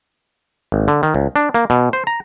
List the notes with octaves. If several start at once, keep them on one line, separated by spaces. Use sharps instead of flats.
G#1
D3
D#3
C#2
D4
A#3
B2
C5
A#5